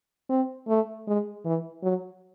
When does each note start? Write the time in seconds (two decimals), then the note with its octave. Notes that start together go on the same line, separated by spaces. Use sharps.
0.30 C4
0.68 A3
1.07 G#3
1.45 E3
1.83 F#3